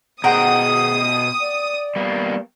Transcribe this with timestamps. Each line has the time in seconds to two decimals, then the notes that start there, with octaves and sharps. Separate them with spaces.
0.24 B2 G#4 C5 F#5 G5 A#5 D#6
1.41 D5
1.96 G3 A#3 B3